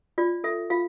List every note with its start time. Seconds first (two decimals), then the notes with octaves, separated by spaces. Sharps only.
0.18 F4 D5
0.44 A4 E5
0.70 F4 F5